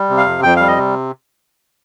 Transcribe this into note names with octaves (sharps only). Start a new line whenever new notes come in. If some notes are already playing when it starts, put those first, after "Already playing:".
Already playing: G3
C3
F5
F2
F2 G5
G3 F5
D#5
C3